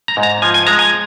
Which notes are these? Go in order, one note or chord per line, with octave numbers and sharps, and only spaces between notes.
A#5
G#2
A#5
F3 G#5
G#5
G#3 A#5
G#5